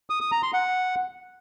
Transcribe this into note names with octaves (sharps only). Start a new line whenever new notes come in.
D#6
D#6
A#5
C6
F#5